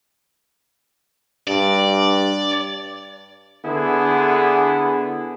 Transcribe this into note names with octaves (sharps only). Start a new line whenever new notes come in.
G2 D5
D3 B3 E4 G#4